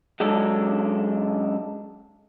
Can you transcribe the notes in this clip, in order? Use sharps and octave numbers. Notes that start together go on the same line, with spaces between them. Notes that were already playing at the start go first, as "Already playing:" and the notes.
F#2 G#3 C#4 D4 A4